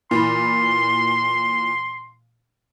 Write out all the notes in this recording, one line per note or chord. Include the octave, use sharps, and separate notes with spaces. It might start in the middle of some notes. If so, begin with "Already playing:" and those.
A#2 E3 B5 C6